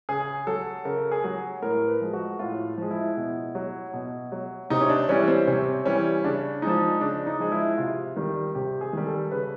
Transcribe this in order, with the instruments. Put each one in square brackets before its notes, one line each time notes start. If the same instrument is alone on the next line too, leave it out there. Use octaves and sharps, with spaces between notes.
[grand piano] C#3 G#4
F#3 A4
C#3 A#4
G#4
F#3
A2 A#4
B4
F3 G#3
F#4
A2 F4
F3 G#3
E4
B2
F#3
B2
F#3
C3 D#4
C#4
D4
E3 G3 C#4
C4
C3 C#4
E3 G3 C#4
C#3 D4
F3 G#3 D#4
C#3 D4
D#4
F3 G#3
E4
C3 F4
D#3 G3
C3 G4
G#4
D#3 G3
A4
C#3 B4